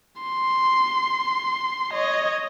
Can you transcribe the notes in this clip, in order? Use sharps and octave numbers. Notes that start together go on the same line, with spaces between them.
C6
C#5 D#5